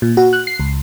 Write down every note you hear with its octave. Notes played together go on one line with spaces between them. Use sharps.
A#2
F#4
F#6
C7
C#2